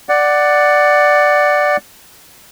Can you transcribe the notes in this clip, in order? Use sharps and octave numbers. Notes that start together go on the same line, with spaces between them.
D5 F#5